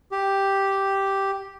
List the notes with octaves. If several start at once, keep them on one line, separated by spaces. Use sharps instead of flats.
G4